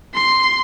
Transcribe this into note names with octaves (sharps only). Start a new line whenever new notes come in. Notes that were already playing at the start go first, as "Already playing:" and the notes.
C6